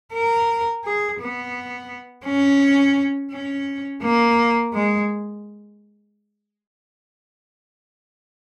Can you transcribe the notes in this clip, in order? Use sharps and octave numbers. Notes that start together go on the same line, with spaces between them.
A#4
G#4
B3
C#4
C#4
A#3
G#3